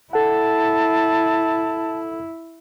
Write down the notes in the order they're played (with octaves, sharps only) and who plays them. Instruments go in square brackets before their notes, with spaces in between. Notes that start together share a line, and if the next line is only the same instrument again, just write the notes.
[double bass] E4 [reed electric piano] A4 F#5 [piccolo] A5